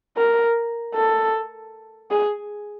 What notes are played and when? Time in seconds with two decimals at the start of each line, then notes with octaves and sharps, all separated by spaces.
0.17 A#4
0.95 A4
2.11 G#4